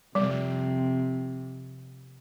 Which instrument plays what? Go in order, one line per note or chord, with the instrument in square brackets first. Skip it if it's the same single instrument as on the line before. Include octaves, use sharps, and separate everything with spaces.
[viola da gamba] F2 C3 [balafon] G3